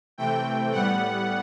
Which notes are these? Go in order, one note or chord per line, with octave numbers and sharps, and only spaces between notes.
C3 E3 A3 C4 G5
A2 G3 B3 F#5